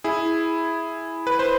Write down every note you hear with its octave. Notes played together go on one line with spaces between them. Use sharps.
E4 G#4
B4
C5